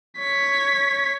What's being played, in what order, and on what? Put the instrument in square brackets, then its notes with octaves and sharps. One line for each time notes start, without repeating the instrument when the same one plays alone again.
[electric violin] C#5 B6